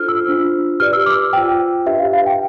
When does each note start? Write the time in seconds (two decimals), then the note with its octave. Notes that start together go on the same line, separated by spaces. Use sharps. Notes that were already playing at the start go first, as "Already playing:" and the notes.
Already playing: D4 F4 A4 C5 F6
0.09 E6
0.26 D4 F4 C5
0.80 G4 B4 D5 F6
0.93 E6
1.06 D6
1.33 F4 C5 G5
1.86 D4 G4 B4 E5
1.99 F5
2.13 F5
2.26 G5